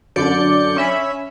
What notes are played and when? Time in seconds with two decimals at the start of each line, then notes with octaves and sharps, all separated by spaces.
0.16 F#2 D3 D5 G6 C#7
0.76 C#4 E5 B5